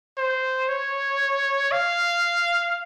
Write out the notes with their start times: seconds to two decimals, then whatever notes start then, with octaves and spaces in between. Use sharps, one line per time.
0.18 C5
0.69 C#5
1.72 F5